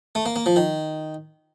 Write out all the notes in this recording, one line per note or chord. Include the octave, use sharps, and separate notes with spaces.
A3
A#3
A#3
F3
D#3